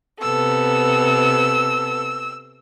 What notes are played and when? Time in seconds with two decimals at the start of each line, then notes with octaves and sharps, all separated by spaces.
0.21 C3 B3 A4 E6